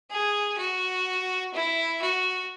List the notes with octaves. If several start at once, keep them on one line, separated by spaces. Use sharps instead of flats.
G#4
F#4
E4
F#4